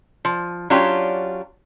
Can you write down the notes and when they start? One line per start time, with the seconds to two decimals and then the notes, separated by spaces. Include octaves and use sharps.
0.25 F3
0.70 F#3 C#4 D4 F4 G4